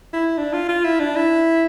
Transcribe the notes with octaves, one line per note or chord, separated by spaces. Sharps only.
E4
D4
F4
F4
E4
D4
E4